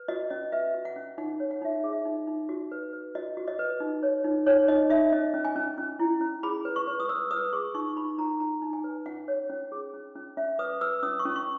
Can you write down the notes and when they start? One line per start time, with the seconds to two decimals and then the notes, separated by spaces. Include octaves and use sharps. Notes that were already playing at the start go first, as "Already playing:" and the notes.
Already playing: B4
0.08 F#4 D#5
0.30 C#4 D#5
0.52 B4 E5
0.74 F#4
0.85 F#5
0.96 C#4
1.18 D#4 F#5
1.40 C#5
1.51 F#5
1.62 D#4 E5
1.79 D#5
1.84 G#4
1.93 E5
2.05 D#4
2.27 D#4
2.49 F#4
2.72 B4
2.93 B4
3.15 F#4 D#5
3.37 F#4
3.48 D#5
3.59 B4
3.80 D#4
4.03 C#5
4.24 D#4
4.46 D#4 C#5
4.68 D#4 D#5
4.90 D#4 E5
5.12 C#4 D#5
5.34 C#4
5.45 G#5
5.56 C#4
5.78 C#4
6.00 E4
6.21 C#4
6.43 G#4 B5
6.65 B4
6.76 C#6
6.87 B4
7.00 D#6
7.09 B4 E6
7.31 B4 D#6
7.53 G#4 C#6
7.74 D#4 C#6
7.96 D#4 B5
8.18 D#4 A#5
8.40 D#4 A#5
8.62 D#4
8.73 G#5
8.84 B4
9.06 C#4 F#5
9.28 C#5
9.50 C#4
9.72 G#4
9.94 C#4
10.15 C#4
10.37 C#4 E5
10.59 B4 D#6
10.81 B4 E6
11.03 C#4 D#6
11.19 C#6
11.25 C#4
11.36 C#6